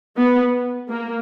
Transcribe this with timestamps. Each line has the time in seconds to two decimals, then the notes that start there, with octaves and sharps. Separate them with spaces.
0.17 B3
0.90 A#3